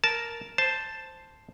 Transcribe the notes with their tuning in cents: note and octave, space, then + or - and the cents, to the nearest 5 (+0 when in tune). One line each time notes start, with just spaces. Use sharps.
A#4 +0 A5 -10
C5 +0 A5 +0